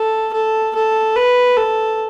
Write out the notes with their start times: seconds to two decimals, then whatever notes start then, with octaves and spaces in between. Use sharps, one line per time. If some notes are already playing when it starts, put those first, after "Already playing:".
Already playing: A4
0.33 A4
0.75 A4
1.16 B4
1.57 A4